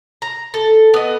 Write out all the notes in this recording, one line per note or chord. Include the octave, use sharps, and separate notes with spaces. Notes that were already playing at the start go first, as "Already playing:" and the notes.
A#5
A4
B3 D#5